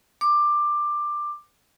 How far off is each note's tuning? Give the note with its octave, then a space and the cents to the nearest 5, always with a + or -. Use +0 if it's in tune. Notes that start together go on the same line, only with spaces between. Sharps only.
D6 +15